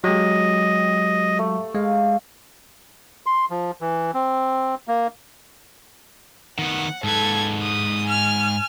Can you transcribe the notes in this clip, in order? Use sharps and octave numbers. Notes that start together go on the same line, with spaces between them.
F#3 G#3 G4 D#5
A3
G#3 F5
C6
F3
E3
C4
A#3
D#3 B3 F#5
G#2 A4 B4 G#6
D#6
G#5 F6